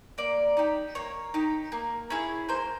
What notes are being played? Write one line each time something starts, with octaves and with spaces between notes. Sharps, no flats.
A#3 D5
D#4 G4
A#3 C#5
D#4 G4
A#3
C#4 E4 G#4
A#3 C5